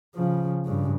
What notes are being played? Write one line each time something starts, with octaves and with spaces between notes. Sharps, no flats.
C#3 F3
G2 C#3